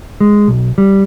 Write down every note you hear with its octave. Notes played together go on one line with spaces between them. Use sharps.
G#3
B1
G3